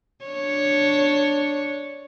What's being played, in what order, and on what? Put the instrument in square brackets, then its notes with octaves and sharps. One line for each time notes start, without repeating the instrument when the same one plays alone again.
[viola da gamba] D4 C#5